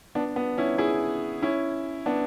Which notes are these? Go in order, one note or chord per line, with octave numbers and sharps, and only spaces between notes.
B3 D4
B3
C#4 E4
E4 G#4
C#4 E4
B3 D4